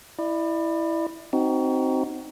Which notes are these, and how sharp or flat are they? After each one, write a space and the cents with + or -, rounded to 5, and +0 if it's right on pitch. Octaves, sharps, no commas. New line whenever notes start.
E4 +0 D5 +35
C4 +0 D#4 +0 F#4 +25